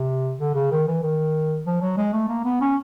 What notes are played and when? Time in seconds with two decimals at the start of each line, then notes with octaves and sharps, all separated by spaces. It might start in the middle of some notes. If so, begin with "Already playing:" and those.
Already playing: C3
0.39 D3
0.55 C#3
0.71 D#3
0.87 E3
1.02 D#3
1.66 F3
1.82 F#3
1.97 G#3
2.13 A3
2.29 A#3
2.44 B3
2.61 C#4